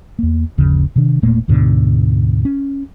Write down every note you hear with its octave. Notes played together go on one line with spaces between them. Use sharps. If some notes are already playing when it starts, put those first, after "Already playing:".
E2 A#3
G1 D#2 C#3 F3
C3 D#3 D4
E1 A#2 A3 A#3
D2 G#2 B2 D3
C#4